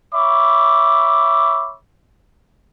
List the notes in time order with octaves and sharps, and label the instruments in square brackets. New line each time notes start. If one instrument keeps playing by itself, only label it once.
[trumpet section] C#5 E5 B5 D6